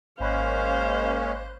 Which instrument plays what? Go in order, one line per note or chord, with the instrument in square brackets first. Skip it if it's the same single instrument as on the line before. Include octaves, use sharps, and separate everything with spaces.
[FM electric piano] G#1 B5 F#6 [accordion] G#3 A#3 C#4 [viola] C5 [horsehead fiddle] F5